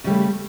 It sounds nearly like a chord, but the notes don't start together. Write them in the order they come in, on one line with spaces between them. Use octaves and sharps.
C#3 G3 A3